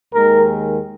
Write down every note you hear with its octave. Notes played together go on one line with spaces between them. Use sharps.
D#2 D#3 G#3 A#4